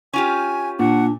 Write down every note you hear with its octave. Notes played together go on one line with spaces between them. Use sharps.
C#4 F4 G4 G#5
A#2 D4 F#5